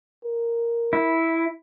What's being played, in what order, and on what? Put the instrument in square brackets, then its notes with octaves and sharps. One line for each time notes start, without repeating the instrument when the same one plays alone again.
[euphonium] A#4
[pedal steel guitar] E4